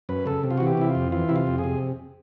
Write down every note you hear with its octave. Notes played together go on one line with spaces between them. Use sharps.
F#2 B4
C#3 A4
C3
F4
E3 F#4
G4
C3 E4
F4
F2
E3 F4
C3 E4
F4
F2
G#4
C3